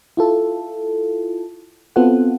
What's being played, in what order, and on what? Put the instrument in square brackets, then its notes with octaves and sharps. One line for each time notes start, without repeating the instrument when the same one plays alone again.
[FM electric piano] E4 F4 A4
B3 C4 F4 F#4 A4 F#5